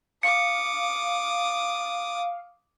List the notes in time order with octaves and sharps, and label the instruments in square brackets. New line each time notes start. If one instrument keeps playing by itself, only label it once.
[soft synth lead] F5 [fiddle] D6 D#6 [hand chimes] C#7